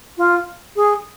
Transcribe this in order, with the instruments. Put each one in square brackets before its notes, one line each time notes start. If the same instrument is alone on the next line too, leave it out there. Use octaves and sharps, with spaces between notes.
[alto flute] F4
G#4